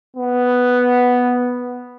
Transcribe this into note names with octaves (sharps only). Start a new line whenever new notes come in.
B3